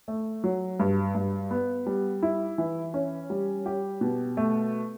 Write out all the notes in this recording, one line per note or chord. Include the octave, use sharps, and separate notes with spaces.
A3
F#3
G2
G2
B3
G3
E4
E3
C#4
G3
G4
B2
A3